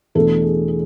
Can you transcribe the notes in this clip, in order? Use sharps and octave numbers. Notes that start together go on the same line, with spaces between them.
E2 B2 A3 D4 A4
G#4
G#4